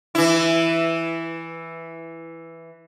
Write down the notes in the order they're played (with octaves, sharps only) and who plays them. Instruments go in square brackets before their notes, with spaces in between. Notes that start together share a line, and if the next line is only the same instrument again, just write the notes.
[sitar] E3 E4